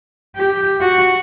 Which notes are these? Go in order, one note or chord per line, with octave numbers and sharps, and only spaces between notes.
G4
F#4